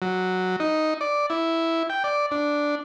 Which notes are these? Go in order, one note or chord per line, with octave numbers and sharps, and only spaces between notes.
F#3
D#4
D5
E4
G5
D5
D4